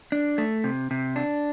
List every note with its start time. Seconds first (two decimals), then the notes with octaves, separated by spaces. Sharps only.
0.12 D4
0.38 A3
0.64 C3
0.91 C3
1.16 D4